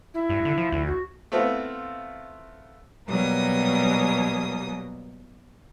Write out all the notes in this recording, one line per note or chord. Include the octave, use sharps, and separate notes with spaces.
E4
G2
D3
F3
D2
F#4
A3 B3 C4 E4 F4
B2 F#3 G3 A#3 D#6